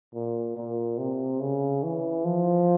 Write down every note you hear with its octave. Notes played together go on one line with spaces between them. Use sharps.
A#2
A#2
C3
C#3
E3
F3